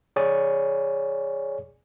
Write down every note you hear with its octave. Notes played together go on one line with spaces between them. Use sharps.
G#4 C#5 D5 G#5